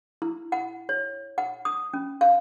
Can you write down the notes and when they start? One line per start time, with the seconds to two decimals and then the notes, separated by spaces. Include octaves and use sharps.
0.22 E4
0.52 F#5
0.89 C#5
1.38 F#5
1.65 D#6
1.94 C#4
2.21 F5